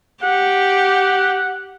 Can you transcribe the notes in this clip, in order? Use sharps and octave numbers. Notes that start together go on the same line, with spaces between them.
G4 F#5